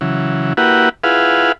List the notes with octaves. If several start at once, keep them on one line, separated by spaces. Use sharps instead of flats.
C#3 E3 F#3
A#3 E4 F#4 G4 B4 F#5
E4 F4 G#4 B4 F5 F#5